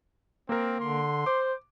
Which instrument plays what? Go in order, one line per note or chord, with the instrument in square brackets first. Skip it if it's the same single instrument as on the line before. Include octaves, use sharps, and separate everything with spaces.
[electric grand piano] A#3 A#4 [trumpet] C4
[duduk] D3 [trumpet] C6
[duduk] C5 [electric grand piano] D6